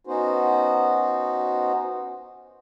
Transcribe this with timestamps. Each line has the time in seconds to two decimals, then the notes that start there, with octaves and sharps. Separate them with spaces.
0.07 B3 C#4 D#4 F#4 C5